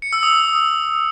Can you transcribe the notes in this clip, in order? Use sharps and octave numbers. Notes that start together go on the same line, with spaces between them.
C#7
E6
D#6
D#6